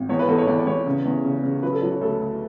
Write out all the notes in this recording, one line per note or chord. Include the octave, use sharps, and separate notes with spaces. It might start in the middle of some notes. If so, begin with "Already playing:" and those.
Already playing: G#1
E2 C#5
B4
E2 A4
C#5
E2 D5
D5
E2 C#5
C#3
E2
C#3
C#3
F#3 B4
A4
F#3 D5
C#5
D2 A4
D2